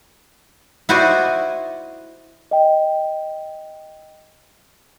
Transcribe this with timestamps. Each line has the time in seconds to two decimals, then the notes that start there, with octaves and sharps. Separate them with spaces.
0.89 E4 F#4 C5 D5 D#5
2.51 D#5 G5